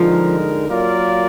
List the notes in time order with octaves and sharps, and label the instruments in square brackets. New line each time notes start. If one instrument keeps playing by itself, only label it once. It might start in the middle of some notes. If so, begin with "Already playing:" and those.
Already playing: [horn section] D3 G#3 D#4 A#4 [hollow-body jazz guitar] F3
[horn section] F#3 A#3 F4 A#4 D5